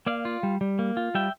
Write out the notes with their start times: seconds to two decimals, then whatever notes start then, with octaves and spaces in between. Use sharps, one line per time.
0.06 A#3 D5 F5
0.25 F4
0.43 G3
0.61 G3
0.79 A#3
0.97 F4
1.15 G3 E5 G5